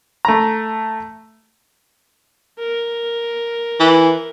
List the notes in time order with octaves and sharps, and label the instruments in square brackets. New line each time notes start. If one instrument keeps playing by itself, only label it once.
[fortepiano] A3 A#5
[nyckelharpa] A#4
[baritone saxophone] E3